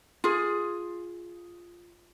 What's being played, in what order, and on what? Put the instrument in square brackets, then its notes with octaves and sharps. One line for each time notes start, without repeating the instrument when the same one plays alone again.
[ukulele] F4 G#4